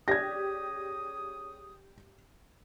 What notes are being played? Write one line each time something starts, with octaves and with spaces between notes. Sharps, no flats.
C#4 G4 G#4 D5 D#6 G#6 A#6